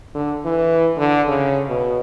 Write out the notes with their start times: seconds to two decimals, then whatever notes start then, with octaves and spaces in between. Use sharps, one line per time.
0.14 D3
0.45 E3
0.97 D3
1.28 C#3
1.68 B2